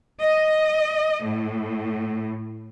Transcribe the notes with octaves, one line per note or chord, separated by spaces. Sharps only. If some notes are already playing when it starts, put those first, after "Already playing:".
D#5
A2